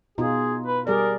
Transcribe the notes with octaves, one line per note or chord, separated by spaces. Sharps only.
B2 D#4 F4 G#4
B4
G3 G#4 A#4 D5